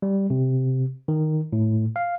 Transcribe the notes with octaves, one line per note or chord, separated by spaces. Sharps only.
G3
C3
D#3
A2
F5